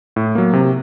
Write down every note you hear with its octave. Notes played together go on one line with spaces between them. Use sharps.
A2
F#3 A#3
C3